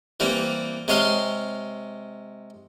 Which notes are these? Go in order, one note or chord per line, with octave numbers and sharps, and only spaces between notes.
E3 G3 A#3 C4
C3 G#3 C#5 F5 C6